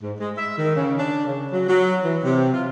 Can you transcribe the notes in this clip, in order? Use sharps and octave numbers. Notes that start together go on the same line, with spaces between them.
G#2
G#3
E5
D#3
C#3
D4
C#3
F#3
F#3
E3
C3
F4